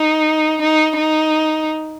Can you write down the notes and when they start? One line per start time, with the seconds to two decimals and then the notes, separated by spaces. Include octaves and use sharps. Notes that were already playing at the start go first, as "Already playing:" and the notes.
Already playing: D#4
0.61 D#4
0.98 D#4